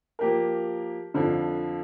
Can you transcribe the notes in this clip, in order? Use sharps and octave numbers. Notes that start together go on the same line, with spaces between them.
F3 A#3 G4 A#4
F2 D3 F3